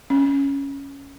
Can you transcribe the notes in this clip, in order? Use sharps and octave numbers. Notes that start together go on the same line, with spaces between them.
C#4